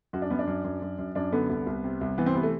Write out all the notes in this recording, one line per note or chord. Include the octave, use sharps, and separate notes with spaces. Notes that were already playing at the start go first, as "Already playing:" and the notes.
F#2 F#4
D4
F#2 B3
D4
F#2
F#2
F#2
F#2
F#2 D4
D3 B3
C2 B3
C2
C3
C2
E3 B3
C4
C3 B3
A3